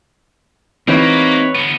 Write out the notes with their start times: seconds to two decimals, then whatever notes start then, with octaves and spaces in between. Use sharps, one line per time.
0.88 E3 A#3 C4 D#4 G4 B4 C#5
1.55 D3 B3